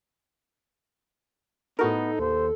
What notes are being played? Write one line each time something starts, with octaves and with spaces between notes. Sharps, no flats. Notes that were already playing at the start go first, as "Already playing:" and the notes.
A2 B3 D#4 F#4 A4 A#4
D#2 C5